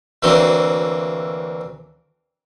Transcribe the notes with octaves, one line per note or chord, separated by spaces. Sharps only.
D2 D3 E3 F#3 A#3 C4